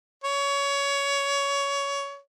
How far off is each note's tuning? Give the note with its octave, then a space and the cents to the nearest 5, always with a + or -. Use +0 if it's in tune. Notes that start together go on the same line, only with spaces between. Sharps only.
C#5 +20